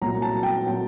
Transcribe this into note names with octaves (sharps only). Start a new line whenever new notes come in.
C2 A#2 F#3 A#5
A5
G5
A#2 F#3